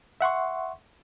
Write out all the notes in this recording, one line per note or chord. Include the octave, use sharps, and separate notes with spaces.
E5 F#5 C6 C#6